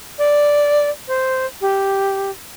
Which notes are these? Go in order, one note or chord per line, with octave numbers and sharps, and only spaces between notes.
D5
C5
G4